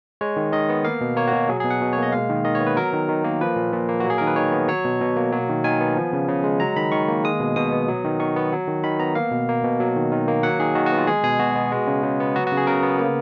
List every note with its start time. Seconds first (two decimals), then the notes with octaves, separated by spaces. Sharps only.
0.21 G#3 C#5
0.37 D#3
0.52 D#3 D#5
0.69 B3
0.85 A#3 F5
1.01 B2
1.17 A#3 C#5
1.28 F#4
1.33 B2
1.49 F#3 G#4
1.60 G#4
1.64 B2
1.70 F#5
1.81 B2
1.93 A#3 C#5
2.03 D#5
2.12 G#3 F5
2.29 D#3
2.45 D#3 D#5
2.55 C#5
2.60 B3
2.67 B4
2.77 F#3 A#4
2.93 D#3
3.09 D#3
3.24 A#3
3.41 F3 B4
3.56 A#2
3.73 A#2
3.88 A#3
4.00 F#4
4.05 F#3 G#4
4.18 D#3 A#4
4.27 B4
4.36 D#3 C#5
4.52 B3
4.68 F#3 C#5
4.85 B2
5.01 B2
5.16 A#3
5.32 F#3
5.49 D#3
5.64 D#3 G#5
5.80 B3
5.96 F3
6.13 C#3
6.28 C#3
6.44 G#3
6.60 F#3 A#5
6.77 D#3 B5
6.92 D#3 C#6
7.08 A#3
7.24 G#3 D#6
7.40 B2
7.56 B2 D#6
7.72 B3
7.88 F#3
8.05 D#3
8.20 D#3 C#6
8.36 B3
8.53 F#3
8.68 D#3
8.84 D#3 B5
8.99 B3 A#5
9.15 A#3 F5
9.31 B2
9.48 A#3
9.64 B2
9.80 F#3
9.96 D#3
10.12 D#3
10.27 A#3
10.43 F#3 F#5
10.59 D#3 G#4
10.75 D#3 F#4
10.86 F#4
10.92 B3
10.98 F4
11.07 G#3 G#4
11.24 B2 G#4
11.39 B2 F#4
11.56 B3
11.72 G#3
11.87 C#3
12.03 C#3
12.20 B3
12.36 F#3 F#4
12.47 F#4
12.52 C#3
12.57 G#4
12.67 C#3 A#4
12.83 B3
12.99 A#3